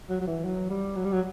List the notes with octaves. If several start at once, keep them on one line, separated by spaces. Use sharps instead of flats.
F#3
F#3
E3
F#3
G3
F#3
G3
F#3